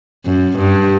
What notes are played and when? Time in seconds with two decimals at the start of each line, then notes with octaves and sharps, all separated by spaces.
0.26 F#2
0.59 G2